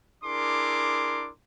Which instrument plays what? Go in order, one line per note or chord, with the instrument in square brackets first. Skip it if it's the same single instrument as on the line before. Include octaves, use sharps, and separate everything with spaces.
[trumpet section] D4 E4 G#4 A#4 C6 D6